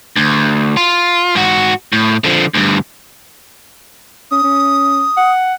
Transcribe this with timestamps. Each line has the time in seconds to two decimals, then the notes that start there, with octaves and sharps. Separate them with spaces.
0.16 D2
0.77 F4
1.35 G#2 F#4
1.93 A2
2.24 D3 F3
2.54 D2 G2
4.31 C#4 D#6
4.43 C#4
5.17 F#5